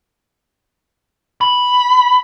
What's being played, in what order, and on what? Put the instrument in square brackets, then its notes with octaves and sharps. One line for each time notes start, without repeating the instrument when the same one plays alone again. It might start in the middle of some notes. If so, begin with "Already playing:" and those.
[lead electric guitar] B5